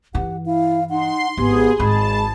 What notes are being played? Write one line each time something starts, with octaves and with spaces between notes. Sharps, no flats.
G2 E3 G4 F#5
E4 F5
D#4 F#5 C6
G#1 B3 G4 G#4
G#1 G#3 A5 B5